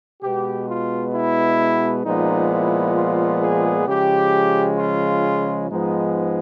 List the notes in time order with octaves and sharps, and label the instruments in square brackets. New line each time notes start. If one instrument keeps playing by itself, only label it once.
[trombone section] B2 G#3 B3 G4
F4
E4
A#2 F3 G#3 B3 D#4
E4
F4
G#4
C#3 F3 G#3 G4
F4
G#2 F3 G#3 B3 D#4